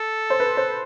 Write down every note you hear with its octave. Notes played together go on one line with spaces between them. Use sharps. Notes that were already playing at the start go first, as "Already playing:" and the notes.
Already playing: A4
C5
B4
C5